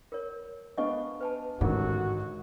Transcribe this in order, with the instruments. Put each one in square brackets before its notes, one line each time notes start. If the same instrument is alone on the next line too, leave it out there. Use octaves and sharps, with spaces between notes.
[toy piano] A#4 C#5
[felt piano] B3 D4 F5 [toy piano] D#5 G#5 C#6
[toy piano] B4 G#5 A5
[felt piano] A1 D3 D#3 [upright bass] G#2 [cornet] F#4 [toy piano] G#4 A#4